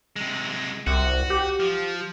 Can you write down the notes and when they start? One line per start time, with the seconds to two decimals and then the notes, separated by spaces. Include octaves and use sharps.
0.16 C3 G#3
0.87 C2 F#4
1.30 G4
1.60 F3